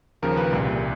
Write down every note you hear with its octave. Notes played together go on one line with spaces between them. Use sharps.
D#2 C#3 F3 A#4
B4
C2 A#2 G3